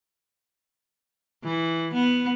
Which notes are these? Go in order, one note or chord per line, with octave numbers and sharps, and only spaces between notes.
E3
B3